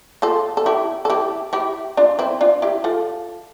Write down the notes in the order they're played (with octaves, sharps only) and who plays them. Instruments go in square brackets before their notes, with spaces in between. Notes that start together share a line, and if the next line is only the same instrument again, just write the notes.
[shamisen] F4 A4
A4
E4 G4
A4
E4 G4
E4 G4
D4 F4
C4 E4
D4 F4
E4 G4
F4 A4